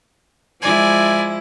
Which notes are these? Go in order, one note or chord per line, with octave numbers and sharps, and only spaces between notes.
F3 G#3 E4 D5 G#5